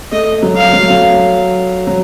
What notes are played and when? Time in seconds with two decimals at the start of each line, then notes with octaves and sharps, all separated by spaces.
0.12 A3 D#5
0.42 F#3
0.57 F5
0.73 F#3
0.82 A3
0.90 F#3
1.87 F#3